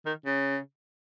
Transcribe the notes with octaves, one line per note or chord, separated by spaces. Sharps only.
D#3
C#3